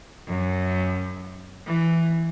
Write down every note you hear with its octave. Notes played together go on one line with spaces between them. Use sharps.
F#2
E3